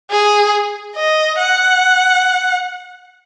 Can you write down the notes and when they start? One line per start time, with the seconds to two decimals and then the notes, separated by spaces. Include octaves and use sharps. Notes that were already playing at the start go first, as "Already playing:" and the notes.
0.11 G#4
0.96 D#5
1.39 F#5